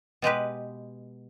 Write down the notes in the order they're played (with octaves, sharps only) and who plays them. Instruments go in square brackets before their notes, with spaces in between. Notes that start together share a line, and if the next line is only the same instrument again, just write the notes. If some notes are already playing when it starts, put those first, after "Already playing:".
[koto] B2 G#3 G4 B4